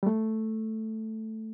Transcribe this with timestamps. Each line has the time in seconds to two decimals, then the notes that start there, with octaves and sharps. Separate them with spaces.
0.03 G3
0.06 A3